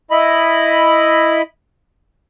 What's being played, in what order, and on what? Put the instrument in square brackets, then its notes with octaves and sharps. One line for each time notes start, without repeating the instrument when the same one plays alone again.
[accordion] E4 D#5 B5